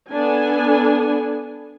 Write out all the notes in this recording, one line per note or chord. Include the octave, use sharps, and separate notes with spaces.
B3 D4 A4 G#5